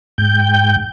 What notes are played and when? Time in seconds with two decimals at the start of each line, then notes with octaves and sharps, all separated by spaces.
0.18 G#2 G5 G6